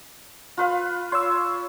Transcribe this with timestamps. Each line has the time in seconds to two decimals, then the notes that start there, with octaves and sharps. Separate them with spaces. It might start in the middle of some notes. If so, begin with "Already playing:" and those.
0.57 F4 B4 F5
1.12 C#5 C6 E6